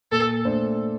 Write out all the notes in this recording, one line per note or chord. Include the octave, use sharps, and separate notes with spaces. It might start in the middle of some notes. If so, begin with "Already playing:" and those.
A#2 A4
A3 D4 A4 C5